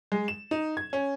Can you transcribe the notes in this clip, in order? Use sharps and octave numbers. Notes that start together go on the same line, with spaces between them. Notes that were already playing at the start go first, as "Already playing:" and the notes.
G#3
E7
D#4
G#6
C#4